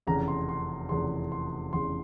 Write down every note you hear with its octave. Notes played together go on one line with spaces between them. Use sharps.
F1 E2 C#3 A#5
C6
C6
F1 E2 C#3 C6
C6
F1 E2 C#3 C6